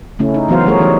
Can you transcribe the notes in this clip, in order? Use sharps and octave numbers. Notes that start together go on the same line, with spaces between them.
C#3 A3 C#4 E4
D#4
E3 F#3 B3 F#4 C5 F5
G3 A3 G#4 A#4 C#5
E3 G3 D#4 C#5